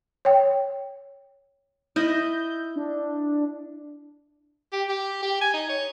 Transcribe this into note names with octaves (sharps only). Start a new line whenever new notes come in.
C#5 G5
E4 D#5 G6
D4
G4
G4
G4
G#5
D#4
C#5